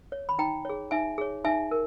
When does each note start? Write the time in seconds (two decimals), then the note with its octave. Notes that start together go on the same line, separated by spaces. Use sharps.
0.12 C#5
0.29 B5
0.38 D#4 G5 A#5
0.65 G#4 C#5
0.91 D#4 E5 G#5
1.18 G#4 C#5
1.45 D#4 E5 G#5
1.71 A#4